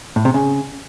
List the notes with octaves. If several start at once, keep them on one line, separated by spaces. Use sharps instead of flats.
A2
C3
C#3